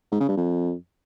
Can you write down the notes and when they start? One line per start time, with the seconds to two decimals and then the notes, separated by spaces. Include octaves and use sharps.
0.12 G#2
0.20 C#3
0.29 G2
0.37 F2